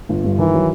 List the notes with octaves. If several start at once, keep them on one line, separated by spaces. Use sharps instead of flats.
G1
G2
D#3 E3
F#3